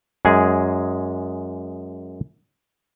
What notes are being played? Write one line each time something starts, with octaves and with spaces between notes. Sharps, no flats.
F#2 G#3 G#4